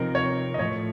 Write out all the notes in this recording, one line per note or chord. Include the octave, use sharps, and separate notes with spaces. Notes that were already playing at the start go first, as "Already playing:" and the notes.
Already playing: C3 F3 C4 D#4 A#4
C#5
D#5
A2 F3 A3 C#5